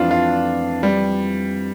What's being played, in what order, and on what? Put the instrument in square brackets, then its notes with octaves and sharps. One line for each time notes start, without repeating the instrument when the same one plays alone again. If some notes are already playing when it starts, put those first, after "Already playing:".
Already playing: [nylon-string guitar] F2 E3 A3 C4 [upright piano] D4 F4
[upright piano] F4
G3